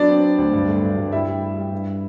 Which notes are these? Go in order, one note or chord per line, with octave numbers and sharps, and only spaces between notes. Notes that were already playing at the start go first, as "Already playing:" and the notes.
Already playing: F#3 B3 D4 D5
C4
C4
D2
G2
A3
G2
G2
G3 E4 E5
G3
G3
G3
G2